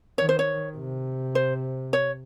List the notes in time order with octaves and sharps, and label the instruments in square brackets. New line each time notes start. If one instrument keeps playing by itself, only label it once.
[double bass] D#3 [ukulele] C#5
[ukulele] C5
C#5
[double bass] C3
[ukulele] C5
C#5